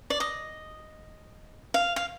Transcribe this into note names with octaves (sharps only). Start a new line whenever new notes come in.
D5
D#5
F5
F5